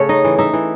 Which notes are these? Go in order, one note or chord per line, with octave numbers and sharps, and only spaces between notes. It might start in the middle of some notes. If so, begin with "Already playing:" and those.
Already playing: C#3 A3 C#5
D#4 D#5
E3
D#4 E5
E3